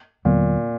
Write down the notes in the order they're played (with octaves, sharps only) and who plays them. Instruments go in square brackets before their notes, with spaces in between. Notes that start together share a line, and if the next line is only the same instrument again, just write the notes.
[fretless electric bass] D#2 D3 F#3 B3 [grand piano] A#2